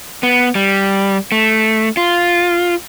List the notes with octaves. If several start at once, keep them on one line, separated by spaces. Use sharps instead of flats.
B3
G3
A3
F4